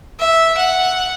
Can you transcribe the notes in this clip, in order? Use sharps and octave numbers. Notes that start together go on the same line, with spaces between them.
E5
F#5